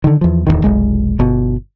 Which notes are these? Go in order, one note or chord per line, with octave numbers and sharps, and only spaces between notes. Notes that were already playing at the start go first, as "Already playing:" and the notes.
D3 D#3
E2 F3
D1 B1 E2 D#3
F1 B1 G#3
G1 B2